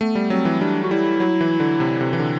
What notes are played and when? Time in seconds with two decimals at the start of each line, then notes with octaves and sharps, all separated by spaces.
0.01 A3 B3
0.15 G3
0.30 F#3 C4
0.45 E3
0.61 G3 D4
0.83 F#4
0.91 G3 E4
1.20 F#3
1.41 E3
1.60 D3
1.80 C3
2.01 C3
2.13 E3
2.20 D3